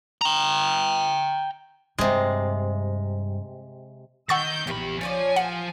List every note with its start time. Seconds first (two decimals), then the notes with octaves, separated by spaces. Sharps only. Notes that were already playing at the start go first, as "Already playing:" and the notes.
0.21 G5 A#5
1.99 G2 C3 G#3
4.29 D#3 F#5 C#6 E6 G6 A6
4.67 A#1 E2 D#3 G4 A#4 B5
5.01 F3 C#4 C#5 D5 G#5
5.36 F4 A4 C5 F#5